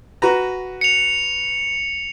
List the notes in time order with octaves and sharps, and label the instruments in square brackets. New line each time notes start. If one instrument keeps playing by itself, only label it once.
[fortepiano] F#4 B4 A#5
[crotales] C#7 F7